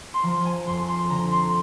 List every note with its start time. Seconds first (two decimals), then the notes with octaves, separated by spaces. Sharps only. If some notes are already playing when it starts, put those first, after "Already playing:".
0.14 C6
0.23 F3 A#5
0.45 G#5
0.67 F2 C6
0.89 C6
1.09 D3 A#5
1.31 C6